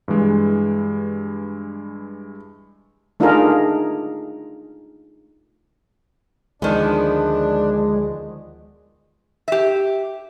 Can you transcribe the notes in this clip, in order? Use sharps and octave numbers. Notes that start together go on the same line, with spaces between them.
G2 E3 G#3
A3 D4 D#4 F4 G#4 A#4
D2 D#3 F3 G#3 B3 D4
G4 E5